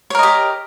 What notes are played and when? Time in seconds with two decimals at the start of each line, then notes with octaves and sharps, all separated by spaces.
0.10 C#5
0.15 A#4
0.19 D#5
0.23 G4